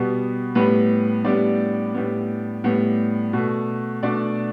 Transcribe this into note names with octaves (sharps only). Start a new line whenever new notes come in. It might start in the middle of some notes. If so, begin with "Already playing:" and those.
Already playing: B2 G3 B3
A2 G3 B3 B4
A2 G3 B3 D4 D5
A2 G3 B3
A2 G3 B3
B2 A3
B2 A3 D4 D5